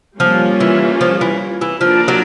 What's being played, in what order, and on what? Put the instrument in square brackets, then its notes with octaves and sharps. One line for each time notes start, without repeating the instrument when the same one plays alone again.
[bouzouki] F3 [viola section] G3 A#3 C#4 F4
[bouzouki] E3
F3
E3
E3
[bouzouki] F3 [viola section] A#3 D4 F4 A#4 D5
[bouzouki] F#3